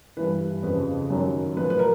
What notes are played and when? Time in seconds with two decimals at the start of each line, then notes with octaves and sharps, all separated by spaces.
0.17 G2 E3 B4
0.63 F2 C#3 F3 B4
1.10 F#2 D#3 F#3
1.57 A2 F3 B4
1.70 B4
1.79 A#4